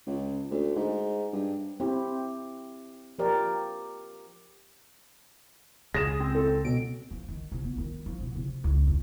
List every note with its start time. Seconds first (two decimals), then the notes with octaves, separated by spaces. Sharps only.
0.07 C#2
0.51 D2
0.76 G#2
1.33 G2
1.80 C4 E4 G4
3.19 F3 G4 A#4 D5
5.94 C#2 G#4 A#6 E7
6.20 C4
6.35 A4
6.65 B2 D7
7.11 F3
7.28 D#3
7.52 C2
7.64 B3
7.78 D#3
8.06 F3
8.21 B2
8.36 C3
8.64 C#2
8.87 E2